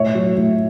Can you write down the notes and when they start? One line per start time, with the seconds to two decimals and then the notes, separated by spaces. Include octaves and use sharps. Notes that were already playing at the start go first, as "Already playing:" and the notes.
Already playing: A2 C#5 E5
0.15 F#3
0.37 A2